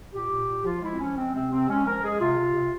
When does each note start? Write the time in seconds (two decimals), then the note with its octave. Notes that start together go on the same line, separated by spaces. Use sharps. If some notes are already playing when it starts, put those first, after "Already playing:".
0.13 A#2 G4
0.30 A#2
0.47 A#2
0.64 F3 F4
0.82 G#3 E4
0.92 C4
0.99 F3 C#4
1.16 G#3 C4
1.33 C3 C4
1.50 C3 C4
1.68 G#3 C#4
1.86 F3 A#4
2.03 G#3 G#4
2.20 C3 F4
2.38 C3
2.55 C3